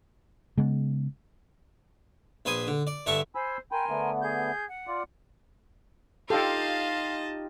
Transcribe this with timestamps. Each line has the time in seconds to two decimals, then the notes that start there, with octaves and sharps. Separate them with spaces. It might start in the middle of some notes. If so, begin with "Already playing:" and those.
0.58 C#3 G#3 B3
2.45 A#1 B4 C5 G#5 D#6
2.67 D3
2.87 D5
3.06 G2 D3 E5 A5 C#6
3.35 C5 G#5 B5 E6
3.72 A#4 G5 G#5 B5 C6
3.89 D3 A3 B3
4.22 G#4 G6
4.67 F#5
4.87 F4 D5
6.30 D#4 F4 G4 A4 D#5 F5 G5 A5